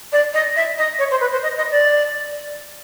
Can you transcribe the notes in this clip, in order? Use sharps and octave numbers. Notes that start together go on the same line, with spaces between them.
D5
D#5
E5
D#5
C#5
C5
B4
C5
D#5
D#5
D5